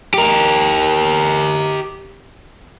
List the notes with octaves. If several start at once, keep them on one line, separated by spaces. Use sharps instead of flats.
G4 A#4